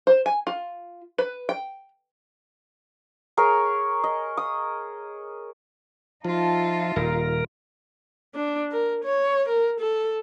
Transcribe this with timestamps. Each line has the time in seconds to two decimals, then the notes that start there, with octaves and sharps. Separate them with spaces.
0.07 C5
0.26 G#5
0.47 F4
1.18 B4
1.49 G5
3.37 G#4 A#4 C#5
4.04 D#5
4.37 D#6
6.25 F3 D#4 F4 E5 A5
6.96 D#1 A#4
8.35 D4
8.72 A#4
9.04 C#5
9.48 A#4
9.80 A4